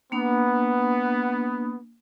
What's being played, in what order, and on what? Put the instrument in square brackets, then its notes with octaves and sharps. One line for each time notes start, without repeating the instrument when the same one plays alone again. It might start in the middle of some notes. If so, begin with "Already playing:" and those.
[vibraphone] A#3 D4 [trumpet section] B3